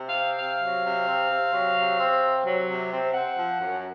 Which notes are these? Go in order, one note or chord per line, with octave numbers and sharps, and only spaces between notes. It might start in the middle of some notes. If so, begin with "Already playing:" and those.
Already playing: C3
F5
C4
C3 F5
F#3
C3
C4
C3
F#3
C3
C4
C3
F#3
C3
C4
C4 F#5
F3
F#2